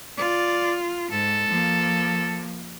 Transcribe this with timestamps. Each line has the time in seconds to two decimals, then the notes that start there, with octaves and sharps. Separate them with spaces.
0.18 F4 D5
1.11 G#2 A4
1.49 F3 A#3